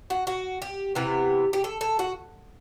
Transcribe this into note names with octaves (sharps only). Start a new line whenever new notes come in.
F#4
F#4
G4
C3 E3 B3 G4
G4
A4
A4
F#4